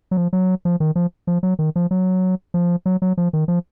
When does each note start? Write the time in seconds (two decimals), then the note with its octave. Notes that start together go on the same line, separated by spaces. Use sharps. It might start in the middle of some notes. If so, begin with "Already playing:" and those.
0.11 F#3
0.17 F3
0.33 F#3
0.65 F3
0.80 D#3
0.96 F3
1.27 F3
1.43 F#3
1.59 D#3
1.76 F3
1.91 F#3
2.54 F3
2.86 F#3
3.02 F#3
3.17 F3
3.33 D#3
3.48 F3